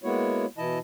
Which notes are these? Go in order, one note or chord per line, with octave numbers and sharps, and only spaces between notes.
G#3 A#3 B3 E4 F#4 C#5
B2 E3 E4 D#5 A5